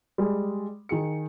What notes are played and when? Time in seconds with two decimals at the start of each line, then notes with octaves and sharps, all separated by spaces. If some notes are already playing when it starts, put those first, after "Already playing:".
0.18 G3 G#3
0.89 D#3 G#4 C#7